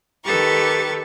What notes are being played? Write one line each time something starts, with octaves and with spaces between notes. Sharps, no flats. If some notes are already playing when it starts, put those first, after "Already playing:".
D#3 G4 A4 B4 C#6 A6